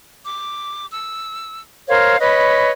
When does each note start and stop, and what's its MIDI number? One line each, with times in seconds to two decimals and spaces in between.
0.24 0.85 86
0.91 1.60 88
1.89 2.16 70
1.89 2.16 72
1.89 2.16 73
1.89 2.16 77
2.20 2.70 71
2.20 2.70 73
2.20 2.70 75
2.20 2.70 83